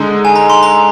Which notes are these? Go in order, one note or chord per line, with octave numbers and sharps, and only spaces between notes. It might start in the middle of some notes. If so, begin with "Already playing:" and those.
Already playing: D3 G#3 D#4
G#5
A#5
C6
A#5